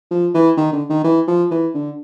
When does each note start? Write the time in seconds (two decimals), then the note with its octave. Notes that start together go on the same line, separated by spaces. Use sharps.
0.11 F3
0.34 E3
0.57 D#3
0.73 D3
0.89 D#3
1.04 E3
1.27 F3
1.51 E3
1.74 D3